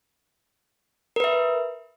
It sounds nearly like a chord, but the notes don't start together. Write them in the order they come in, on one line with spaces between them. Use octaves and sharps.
A#4 B4 E5